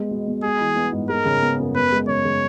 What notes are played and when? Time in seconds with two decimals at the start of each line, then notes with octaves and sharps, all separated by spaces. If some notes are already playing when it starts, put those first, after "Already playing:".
Already playing: G#3 B3
0.11 B2
0.28 B2
0.43 G#3 G#4
0.61 E3
0.76 B3
0.92 G#2
1.09 G#3 A#4
1.25 C#3
1.42 B3
1.60 F#2
1.75 B3 B4
1.92 G#3
2.08 C#3 C#5
2.25 C#3